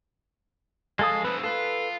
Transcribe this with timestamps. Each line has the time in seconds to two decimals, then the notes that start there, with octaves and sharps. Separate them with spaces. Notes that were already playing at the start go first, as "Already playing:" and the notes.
0.99 F2 G#3 A4 F5 D#6
1.24 A3 C4 B4
1.44 F4 A4 B4